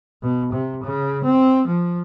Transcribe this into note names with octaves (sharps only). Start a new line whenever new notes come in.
B2
C3
C#3
C4
F3